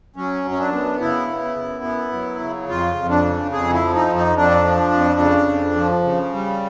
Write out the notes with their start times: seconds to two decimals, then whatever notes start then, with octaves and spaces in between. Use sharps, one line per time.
0.16 F#3 C#4
0.44 F#2
0.51 C#4
0.59 D4
0.73 B3
1.00 C#3 E4
1.28 B3
1.56 F#2
1.84 B3
2.12 F#3
2.40 C#3
2.68 F2 F4
2.96 F2
3.10 D4
3.24 C#3
3.52 F2 G#4
3.73 E4
3.80 F3
3.94 D#4
4.08 F2
4.16 D#4
4.36 F2 D4
4.64 F3
4.93 F2
5.20 C#3
5.48 F2
5.76 F3
6.03 C#3
6.32 G3